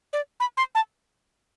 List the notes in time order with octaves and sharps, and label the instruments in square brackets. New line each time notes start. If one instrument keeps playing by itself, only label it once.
[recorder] D5
B5
C6
A5